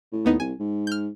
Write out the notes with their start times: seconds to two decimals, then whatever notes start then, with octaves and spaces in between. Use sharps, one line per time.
0.12 A2
0.25 D#2 B3 D#4
0.40 C2 G#5
0.60 G#2
0.87 F6 G6